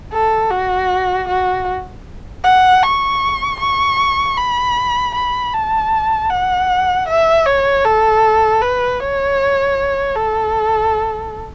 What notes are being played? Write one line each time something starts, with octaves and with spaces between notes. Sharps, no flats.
A4
F#4
F#4
F#5
C#6
C#6
B5
B5
A5
F#5
E5
C#5
A4
B4
C#5
A4